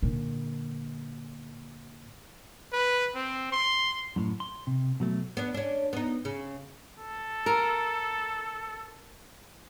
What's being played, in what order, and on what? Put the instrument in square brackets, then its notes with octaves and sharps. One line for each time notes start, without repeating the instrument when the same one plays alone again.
[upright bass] A#2 D3
[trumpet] B4
C4
C6
[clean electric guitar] F#2 A2
C6
C3
B2 F#3 A3
[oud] B3 D4
C#4 D4
B3 D#4
C#3
[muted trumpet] A4
[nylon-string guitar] A#4